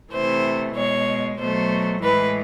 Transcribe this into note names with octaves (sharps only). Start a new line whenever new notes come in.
C3 E3 A3 C5
B2 G#3 C#5
B2 F#3 A3 C5
A2 E3 G#3 B4